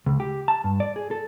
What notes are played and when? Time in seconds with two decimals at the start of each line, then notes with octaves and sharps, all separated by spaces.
0.06 C#2
0.20 G4
0.48 A5
0.64 G2
0.80 D5
0.96 G#4
1.11 A4